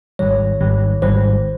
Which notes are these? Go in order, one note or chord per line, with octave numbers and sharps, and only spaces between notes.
G#1 G#2 D#3 G3 C#5
G#1 G#2 D#3 G3
G#1 G#2 D#3 G3 C5